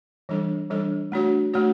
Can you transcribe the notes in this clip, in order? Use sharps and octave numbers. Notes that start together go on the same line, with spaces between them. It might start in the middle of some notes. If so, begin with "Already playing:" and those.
E3 G3 D4 A4
E3 G3 D4 A4
A3 D4 F#4 C#5
A3 D4 F#4 C#5